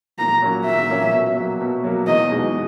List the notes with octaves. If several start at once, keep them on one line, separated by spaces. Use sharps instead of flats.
A#2 A#5
F#3 A#3 C#4
A#2 E5
F#3 A#3 C#4
B2
F#3 A#3
B2
F#3 A#3
E2 D#5
B2 G#3 D#4